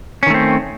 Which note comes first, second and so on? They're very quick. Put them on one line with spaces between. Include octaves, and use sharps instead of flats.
C#4 D#3 A3 C4